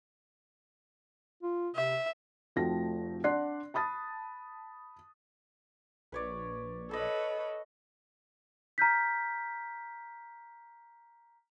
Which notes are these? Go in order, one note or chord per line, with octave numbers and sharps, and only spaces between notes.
F4
C3 E5
F1 F3 A3 F#4 G5 A#6
D4 D5 F#5 C6 F#6 C7
A5 B5 D#6 A6
A#1 B4 C#5 D5
A4 B4 C#5 D#5 B5
A#5 F6 G6 B6